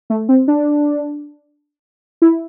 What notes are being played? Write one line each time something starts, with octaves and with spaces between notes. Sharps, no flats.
A3
C4
D4
E4